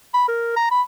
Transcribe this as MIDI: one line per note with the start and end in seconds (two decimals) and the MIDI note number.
0.14 0.24 83
0.28 0.54 70
0.56 0.68 82
0.71 0.82 83